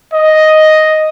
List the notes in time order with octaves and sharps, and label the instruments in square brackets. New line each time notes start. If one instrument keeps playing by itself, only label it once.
[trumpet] D#5